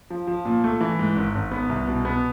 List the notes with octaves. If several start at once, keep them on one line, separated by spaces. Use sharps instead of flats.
F3
F3
A#2
A3
E3
G#2
G#1
G#1
B3
C2
B2
B3